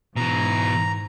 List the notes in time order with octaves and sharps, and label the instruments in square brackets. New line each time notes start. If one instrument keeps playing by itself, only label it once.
[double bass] G#2 [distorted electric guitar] B2 E3 [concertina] A#5